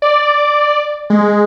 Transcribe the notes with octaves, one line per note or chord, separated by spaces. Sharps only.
D5
G#3